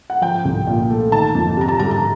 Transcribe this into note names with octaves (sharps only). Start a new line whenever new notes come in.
F#5
F3 G5
C2
A#2
A3
D#3 A5
F2
C3 A#5
A5
G3 A#5
A#5